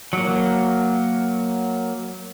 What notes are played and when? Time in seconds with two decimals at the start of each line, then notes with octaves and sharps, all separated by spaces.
0.13 F#3 A#3